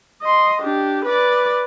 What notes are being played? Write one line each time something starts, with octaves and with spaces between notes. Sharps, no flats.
D#5 C6
D4 G4
B4 D5